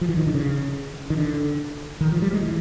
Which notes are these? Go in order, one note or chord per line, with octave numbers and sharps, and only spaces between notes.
F3
E3
D#3
D3
C#3
D#3
D3
D#3
F3
G3
G#3
E3